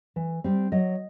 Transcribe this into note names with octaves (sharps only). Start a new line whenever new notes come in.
E3
G3 C4
F#3 D#5